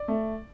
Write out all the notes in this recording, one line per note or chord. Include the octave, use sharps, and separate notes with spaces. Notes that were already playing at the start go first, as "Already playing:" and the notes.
Already playing: D5
A3